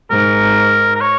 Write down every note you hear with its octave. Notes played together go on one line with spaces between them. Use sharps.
G#2 A#4
A#4
C#5